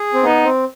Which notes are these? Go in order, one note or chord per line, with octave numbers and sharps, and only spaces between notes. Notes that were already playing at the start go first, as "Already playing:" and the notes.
Already playing: G#4
C4
B3 D#4
C4